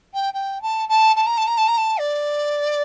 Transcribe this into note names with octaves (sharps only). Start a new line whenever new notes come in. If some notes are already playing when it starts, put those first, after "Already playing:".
G5
G5
A5
A5
A5
A#5
A5
A#5
A5
A#5
A5
D5